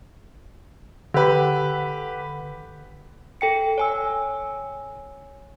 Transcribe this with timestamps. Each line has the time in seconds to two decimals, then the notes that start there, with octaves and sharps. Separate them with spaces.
1.14 D3 G4 B4
3.41 A4 G5 C#7
3.78 C#5 G#5 E6